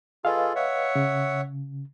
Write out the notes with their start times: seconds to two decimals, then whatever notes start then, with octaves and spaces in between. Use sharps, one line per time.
0.25 F4 G#4 A4 B4 D#5 F5
0.56 C#5 E5 F#5
0.95 C#3